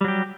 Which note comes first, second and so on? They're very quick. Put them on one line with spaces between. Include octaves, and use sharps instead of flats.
G3 F#3 G4